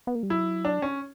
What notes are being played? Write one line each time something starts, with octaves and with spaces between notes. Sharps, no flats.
B3
A#3
G3
F#3 E4
D4
C#4